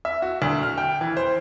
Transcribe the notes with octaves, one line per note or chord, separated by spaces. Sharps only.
E5
F#4
D2
F6
G5
E3
C5